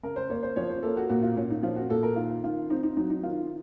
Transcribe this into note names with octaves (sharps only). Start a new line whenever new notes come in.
C#3 A#4
C5
A#3 C#5
C5
F3 C#5
C5
A#3 A4
F#4
A#2 F#4
F4
A#2 C#4
D#4
F3 F4
F#4
A#2 A4
A#4
D#3 F4
D#3 F4
C4 D#4
D#4
F#3 D#4
D#4
D#3 F4